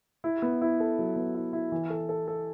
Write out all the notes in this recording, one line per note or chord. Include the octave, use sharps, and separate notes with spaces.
E4
B3
E4
A4
F#3
B3
E4
E4
E3
A4
A4
A4